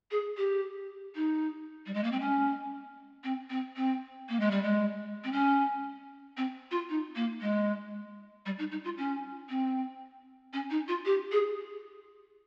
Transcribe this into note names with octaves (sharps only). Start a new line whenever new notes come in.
G#4
G4
D#4
G3
G#3
A#3
C4
C#4
C4
C4
C4
A#3
G#3
G3
G#3
C4
C#4
C4
F4
D#4
A#3
G#3
G3
D#4
D#4
F4
C#4
C4
C#4
D#4
F4
G4
G#4